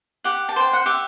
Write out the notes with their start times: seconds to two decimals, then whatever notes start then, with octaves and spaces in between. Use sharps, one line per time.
0.24 G4 F#5
0.49 A5
0.56 C5 G5
0.73 F#5
0.86 G4 E5